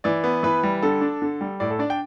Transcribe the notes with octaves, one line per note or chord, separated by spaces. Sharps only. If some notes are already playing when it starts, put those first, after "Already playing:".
E3 D5
B3
E3 B4
G3
D3 A4
D4
D3
G3
A2 D5
A4
D4 D5
G5